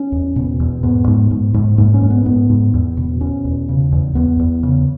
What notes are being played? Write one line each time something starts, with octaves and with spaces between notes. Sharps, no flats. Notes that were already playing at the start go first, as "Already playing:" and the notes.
Already playing: C#4
E2
B2
E2
G#2 B3
G#2
G#2
G#2
G#2 A#3
C#4
G#2
B3
G#2 B3
G#2
E2
B2
B2 C#4
E2
C#3
E2
E2 B3
E2
C#3